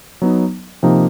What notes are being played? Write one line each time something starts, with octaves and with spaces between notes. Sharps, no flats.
F#3 B3 D#4
C3 F3 A#3 D#4